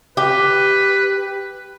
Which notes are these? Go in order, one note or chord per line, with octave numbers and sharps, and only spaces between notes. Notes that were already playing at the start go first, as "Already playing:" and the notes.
G4 B4